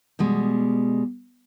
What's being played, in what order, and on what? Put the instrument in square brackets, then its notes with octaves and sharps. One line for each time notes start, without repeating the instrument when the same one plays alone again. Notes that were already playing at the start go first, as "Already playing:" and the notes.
[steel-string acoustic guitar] B2 G3 G#3